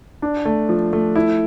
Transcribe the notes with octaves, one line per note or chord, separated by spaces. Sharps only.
D4
A3
F3
A3
E4